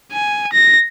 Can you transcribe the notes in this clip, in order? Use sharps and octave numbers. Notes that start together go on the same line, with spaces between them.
G#5
A#6